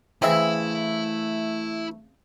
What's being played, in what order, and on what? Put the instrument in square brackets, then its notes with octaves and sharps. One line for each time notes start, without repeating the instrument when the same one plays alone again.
[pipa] C#3 C4 E5 [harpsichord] E3 G#4 C5 [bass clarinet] A3 [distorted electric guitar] E4